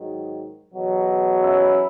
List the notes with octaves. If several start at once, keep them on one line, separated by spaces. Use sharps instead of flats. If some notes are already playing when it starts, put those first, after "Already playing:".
Already playing: G#2 D#3 F#3
E2 B2 F#3
C#4 E4